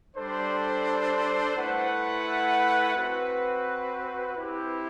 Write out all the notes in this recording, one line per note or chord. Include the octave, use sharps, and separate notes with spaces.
G3 D4 A4 C5
A3 E4 B4 F#5
C4 F#4 B4
C4 E4 G4